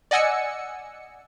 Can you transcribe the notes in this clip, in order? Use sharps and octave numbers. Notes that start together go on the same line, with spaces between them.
D5 D#5 F#5 G#5 E6 C#7